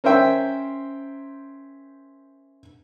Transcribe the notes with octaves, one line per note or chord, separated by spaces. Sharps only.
C#4 A#4 C5 E5 G5